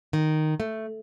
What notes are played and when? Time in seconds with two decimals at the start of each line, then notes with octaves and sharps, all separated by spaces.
0.13 D#3
0.60 A3